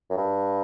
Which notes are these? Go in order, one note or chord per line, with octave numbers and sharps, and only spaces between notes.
F#2
G2